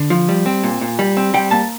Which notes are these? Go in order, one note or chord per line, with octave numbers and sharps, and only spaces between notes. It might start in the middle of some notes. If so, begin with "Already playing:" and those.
Already playing: D3
F3
G3
C4
A#2
A#2
G3
C4
G3 G5
A#3 A5